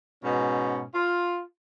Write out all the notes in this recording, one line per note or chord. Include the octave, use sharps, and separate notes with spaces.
G#2 B2 C#4
F4